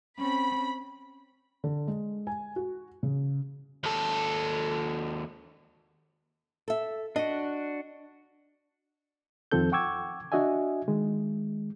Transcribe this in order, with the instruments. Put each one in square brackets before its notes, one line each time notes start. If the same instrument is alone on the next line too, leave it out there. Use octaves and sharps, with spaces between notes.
[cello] C4 C#4 [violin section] B5
[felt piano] D3
G#3
G#5
F#4
C#3
[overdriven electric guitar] D#2 A4
[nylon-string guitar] A4 E5
[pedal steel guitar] D4 F#4 [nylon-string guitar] D#5
[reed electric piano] F2 D#3 F3 C4 A4 G6
F#5 G5 C#6 D6 E6 G#6
D4 F#4 D#5 E5 G#5
D#3 G#3